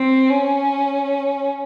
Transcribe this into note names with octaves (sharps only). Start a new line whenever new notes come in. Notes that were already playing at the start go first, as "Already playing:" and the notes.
Already playing: C4
C#4